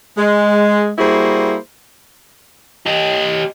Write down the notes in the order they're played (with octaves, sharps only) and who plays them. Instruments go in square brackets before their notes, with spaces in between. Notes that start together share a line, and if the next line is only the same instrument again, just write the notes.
[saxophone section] G#3
G3 A#3 E4 F#4 G#4 C5
[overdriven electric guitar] G4 D#5